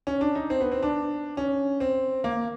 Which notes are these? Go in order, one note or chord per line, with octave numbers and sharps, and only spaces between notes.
C#4
D4
D#4
C4
B3
C4
D4
C#4
C4
A#3